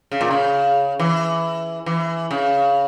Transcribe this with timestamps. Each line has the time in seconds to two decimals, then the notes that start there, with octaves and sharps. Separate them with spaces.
0.11 C#3
0.21 A#2
0.31 C#3
0.99 E3
1.86 E3
2.31 C#3